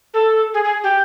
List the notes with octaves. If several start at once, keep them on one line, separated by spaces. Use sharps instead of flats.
A4
G#4
G#4
G4